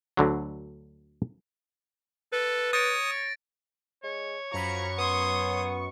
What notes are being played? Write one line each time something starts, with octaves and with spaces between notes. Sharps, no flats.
D2 D3 F#3
A4 B4
C#5 D#6 A6 A#6 D7
G#3 C#5
F#2 F3 A#5 B5 C#6
B3 C6 D#6